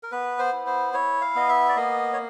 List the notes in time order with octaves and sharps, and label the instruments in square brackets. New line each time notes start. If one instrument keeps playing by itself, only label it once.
[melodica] A#4
B3 B4
C5
E4
C5
E4 C#5
F5
B3 D#5
E5
D5
A#3 D#5
C#5